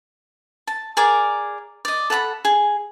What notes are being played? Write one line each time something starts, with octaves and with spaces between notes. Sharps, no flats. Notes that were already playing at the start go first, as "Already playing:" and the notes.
A5
G#4 A#4 D5
D5 D#5
A4 F#5 A5 B5
G#4